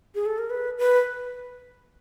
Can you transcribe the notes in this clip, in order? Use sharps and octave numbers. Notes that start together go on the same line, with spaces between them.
G#4
A4
A#4
B4
B4